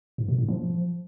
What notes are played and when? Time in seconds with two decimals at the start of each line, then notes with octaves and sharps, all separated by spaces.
0.18 G#2
0.28 B2
0.38 A2
0.48 F3